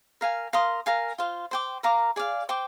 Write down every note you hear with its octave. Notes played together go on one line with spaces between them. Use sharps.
A#4 F5 G#5
A#4 F5 C6 D#6
A#4 F5 G#5
F4 C5 F5
C5 G5 D6
A#4 F5 A#5 D6
G#4 D5 F5
C5 G5 D6